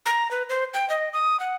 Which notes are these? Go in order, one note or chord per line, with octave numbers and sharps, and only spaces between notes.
A#5
B4
C5
G5
D#5
D#6
F#5